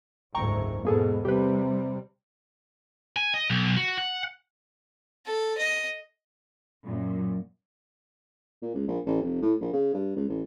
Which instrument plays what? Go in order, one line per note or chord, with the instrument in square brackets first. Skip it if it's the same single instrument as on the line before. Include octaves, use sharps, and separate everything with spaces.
[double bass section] F#1 D2 G#2 [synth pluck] G5 A#5 C#6
[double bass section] E2 G#2 B2 [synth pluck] A#3 G#4 A4
[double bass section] C3 G3 [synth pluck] G4 B4
[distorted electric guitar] G#5
D#5
B1
F#4
F#5
[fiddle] A4
D#5
[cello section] F#2 A#2
[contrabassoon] A#2
C#2
A#1
A1
F1
A2
A#1
C#3
G2
C#2
A1